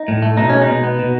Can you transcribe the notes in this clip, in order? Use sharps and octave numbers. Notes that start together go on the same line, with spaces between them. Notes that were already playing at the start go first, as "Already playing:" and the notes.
Already playing: D#4
A2
A3
B2 D#4
G#3 C#4
D#4
B2
B3
B2